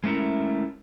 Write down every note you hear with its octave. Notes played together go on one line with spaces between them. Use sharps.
G#3 A3 C#4 E4 A#4